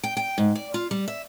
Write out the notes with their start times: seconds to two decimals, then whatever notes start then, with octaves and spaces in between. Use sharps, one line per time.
0.03 G5
0.17 G5
0.38 G#2
0.55 D5
0.74 F4
0.91 G3
1.08 E5